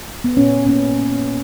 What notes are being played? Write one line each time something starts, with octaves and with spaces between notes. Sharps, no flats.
B3
A#2 C#4
A#3 C#4